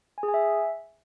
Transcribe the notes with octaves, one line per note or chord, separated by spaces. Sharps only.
G#5
G#4
G#5
E5